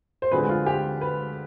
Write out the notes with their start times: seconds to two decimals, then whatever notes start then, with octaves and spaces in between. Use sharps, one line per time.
0.22 C5
0.31 D2 D3 F3 G#3 C4 B4
0.49 F4
0.66 G4
1.01 B4